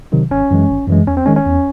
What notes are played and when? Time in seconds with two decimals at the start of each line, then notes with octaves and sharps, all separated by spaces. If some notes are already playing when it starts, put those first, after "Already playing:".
0.12 C3 D#3 F#3
0.31 G#1 C#4
0.51 F#2 E3 G#3
0.69 G#1
0.88 F#2 E3 G#3
1.07 E2 C#4
1.17 C4
1.26 D#3 G#3 C#4
1.36 C#4
1.46 E2